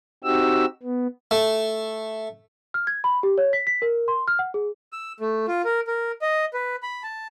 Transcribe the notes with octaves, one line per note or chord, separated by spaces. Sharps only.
C4 D#4 F#4 G4 E6
B3
A3
F6
G#6
B5
G4
C#5
B6
B6
A#4
C6
F6
F#5
G#4
E6
A3
F4
A#4
A#4
D#5
B4
B5
A5